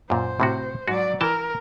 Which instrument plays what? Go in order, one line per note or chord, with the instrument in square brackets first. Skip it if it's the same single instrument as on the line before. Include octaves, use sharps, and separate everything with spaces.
[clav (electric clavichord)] F#2 A#2 [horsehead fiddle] C5
[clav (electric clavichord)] A2 C3 F#4
[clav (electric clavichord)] G#2 F#4 [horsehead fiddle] F#3 D5
[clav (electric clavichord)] E3 G5 A5 [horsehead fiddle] A#4